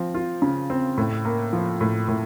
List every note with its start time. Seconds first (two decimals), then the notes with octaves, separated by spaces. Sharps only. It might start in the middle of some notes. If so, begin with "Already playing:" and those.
Already playing: F3 C4
0.14 F4
0.42 C#3
0.70 C4
0.98 A2
1.25 A#3
1.53 F3
1.81 A2
2.08 A2